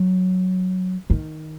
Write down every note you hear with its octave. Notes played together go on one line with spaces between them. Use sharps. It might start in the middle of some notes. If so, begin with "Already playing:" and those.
Already playing: F#3
D#3